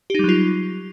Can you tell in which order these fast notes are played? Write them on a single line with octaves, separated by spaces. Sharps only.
G4 D#4 G3 F#3 F4